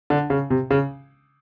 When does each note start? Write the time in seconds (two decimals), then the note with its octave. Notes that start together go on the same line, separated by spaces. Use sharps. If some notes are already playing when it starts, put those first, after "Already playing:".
0.10 D3
0.30 C#3
0.50 C3
0.71 C#3